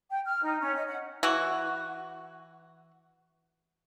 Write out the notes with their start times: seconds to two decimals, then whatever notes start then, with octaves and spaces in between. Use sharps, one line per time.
0.10 G5
0.26 F6
0.42 D#4
0.60 C#4
0.74 D#5
0.87 F#5
1.23 E3 F#4